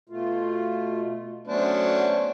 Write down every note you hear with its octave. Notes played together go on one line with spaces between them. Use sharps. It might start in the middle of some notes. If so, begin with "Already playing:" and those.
B2 A3 F4
F#3 A3 B3 C#4 D4 C5